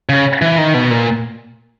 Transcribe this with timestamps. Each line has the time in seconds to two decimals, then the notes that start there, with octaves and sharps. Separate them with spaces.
0.09 C#3
0.42 E3
0.58 D#3
0.74 B2
0.90 A#2